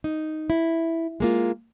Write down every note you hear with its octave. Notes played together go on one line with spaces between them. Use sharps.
D#4
E4
G#3 A#3 F4